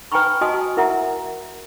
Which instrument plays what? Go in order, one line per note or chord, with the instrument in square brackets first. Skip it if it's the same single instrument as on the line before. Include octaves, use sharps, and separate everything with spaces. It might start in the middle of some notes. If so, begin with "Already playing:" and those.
[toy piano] B4 G5 G#5 A#5 B5 C#6
F#4 D#5 G#5 A5 C6 D#6
E4 A#4 E5 F#5 A#5